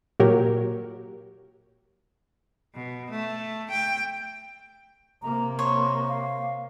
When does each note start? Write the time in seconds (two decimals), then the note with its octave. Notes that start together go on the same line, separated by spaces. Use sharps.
0.20 A#2 F#3 G4 A#4
2.75 B2
3.10 A3
3.71 G5
5.22 C3 A#3 A#5
5.59 C#5 C6
6.09 F5